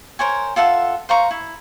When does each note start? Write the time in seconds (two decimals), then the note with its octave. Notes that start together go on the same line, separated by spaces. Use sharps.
0.19 A#4 C5 C#5 G#5
0.56 F4 A4 E5 F#5
1.09 C5 F5 A#5 C#6
1.31 E4